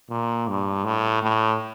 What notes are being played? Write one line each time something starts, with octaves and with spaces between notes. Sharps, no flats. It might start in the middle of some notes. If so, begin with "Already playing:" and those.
A#2
G2
A2
A2